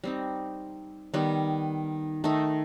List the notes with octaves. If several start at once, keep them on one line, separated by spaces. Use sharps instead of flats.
G3 C4 D#4
D#3 G3 B3
D#3 A3 D#4